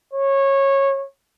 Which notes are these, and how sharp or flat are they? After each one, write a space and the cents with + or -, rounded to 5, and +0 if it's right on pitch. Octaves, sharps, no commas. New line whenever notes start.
C#5 -20